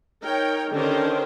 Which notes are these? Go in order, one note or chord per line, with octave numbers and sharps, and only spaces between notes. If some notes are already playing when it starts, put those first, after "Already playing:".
D#4 A#4 C#5 G5
D3 D#3 C#4 G4 A#4 C5